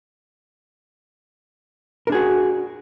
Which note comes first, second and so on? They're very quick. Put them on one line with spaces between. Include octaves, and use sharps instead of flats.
A#4 D4 G#4 F#4